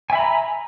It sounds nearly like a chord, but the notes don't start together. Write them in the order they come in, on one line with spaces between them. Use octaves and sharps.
G#5 E5 B5 A#5